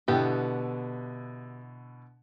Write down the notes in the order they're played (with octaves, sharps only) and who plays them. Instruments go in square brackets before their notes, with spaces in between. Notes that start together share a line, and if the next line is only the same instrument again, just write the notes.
[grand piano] B2 D3 E4 [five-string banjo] B3 G4